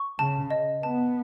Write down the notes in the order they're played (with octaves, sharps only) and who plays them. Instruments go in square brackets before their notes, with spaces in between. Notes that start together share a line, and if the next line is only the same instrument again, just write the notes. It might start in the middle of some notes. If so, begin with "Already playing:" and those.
Already playing: [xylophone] C#6
[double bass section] C#3 [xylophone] A5
[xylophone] D#5
[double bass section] B3 [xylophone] A5